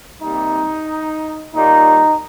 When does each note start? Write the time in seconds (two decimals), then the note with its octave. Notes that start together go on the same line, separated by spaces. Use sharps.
0.21 C3 G3 A#3 D#4
1.55 A#2 G3 A#3 D#4